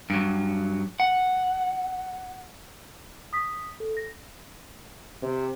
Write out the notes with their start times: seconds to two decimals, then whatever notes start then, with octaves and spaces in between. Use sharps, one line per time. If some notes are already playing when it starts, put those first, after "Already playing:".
0.10 G2 F#3
1.00 F#5
3.33 D#6 B6
3.80 A4
3.97 A#6
5.22 C3